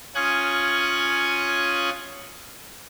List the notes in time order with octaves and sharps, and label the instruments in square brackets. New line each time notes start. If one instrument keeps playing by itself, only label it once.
[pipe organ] C#4 F4 G#5 C#6 D#6 F#6